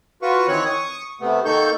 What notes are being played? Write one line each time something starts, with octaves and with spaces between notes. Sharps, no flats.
F4 F#4 B4 C#6
D#3 E3 C4 C#5 C#6 F#6
C#6 D#6
C3 A3 B3
D#3 A#3 D#4 A4 C#6 G6